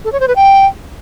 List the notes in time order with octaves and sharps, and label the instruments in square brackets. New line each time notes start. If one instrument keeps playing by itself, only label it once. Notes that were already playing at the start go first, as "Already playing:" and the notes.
[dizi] A4
C#5
C5
B4
G5